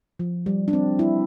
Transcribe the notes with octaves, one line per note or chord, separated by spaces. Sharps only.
F3
G3
D4
C4
E4